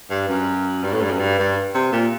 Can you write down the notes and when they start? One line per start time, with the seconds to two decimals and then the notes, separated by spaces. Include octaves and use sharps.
0.10 G2
0.28 F#2
0.83 G2
0.93 A2
1.02 G2
1.11 F#2
1.19 G2
1.39 G2
1.74 C3
1.92 A#2